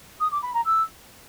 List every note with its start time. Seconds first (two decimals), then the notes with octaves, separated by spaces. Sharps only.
0.20 D#6
0.31 D6
0.42 B5
0.54 A#5
0.65 E6